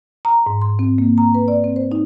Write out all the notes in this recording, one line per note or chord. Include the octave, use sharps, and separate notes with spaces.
A#5
G#2
C6
C4
A#3
A#5
B4
D5
C4
C5
D#4